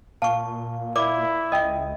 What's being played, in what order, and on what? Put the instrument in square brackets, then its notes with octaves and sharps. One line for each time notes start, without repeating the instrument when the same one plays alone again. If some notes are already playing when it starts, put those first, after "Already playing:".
[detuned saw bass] A#2 [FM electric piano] F5 [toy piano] A5 C#6
[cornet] E4 [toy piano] A#4 D5 D6
[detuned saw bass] C#2 [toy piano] D#5 E5 [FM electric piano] G5 D#6